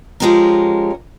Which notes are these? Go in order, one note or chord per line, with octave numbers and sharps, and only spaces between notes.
F3 G#3 C#4 G4 A#4